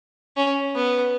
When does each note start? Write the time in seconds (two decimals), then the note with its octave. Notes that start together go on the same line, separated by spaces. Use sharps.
0.37 C#4
0.76 B3